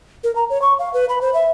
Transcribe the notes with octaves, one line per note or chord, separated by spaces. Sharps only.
A#4
A#5
C#5
C#6
F5
B4
B5
C5
E5